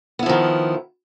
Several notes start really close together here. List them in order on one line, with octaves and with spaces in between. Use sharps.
B3 E4 F3 D#3